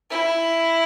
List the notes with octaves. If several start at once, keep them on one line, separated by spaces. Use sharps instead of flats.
E4